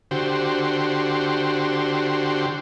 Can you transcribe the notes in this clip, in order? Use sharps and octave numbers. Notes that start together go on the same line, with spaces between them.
D3 F#4 G4 C5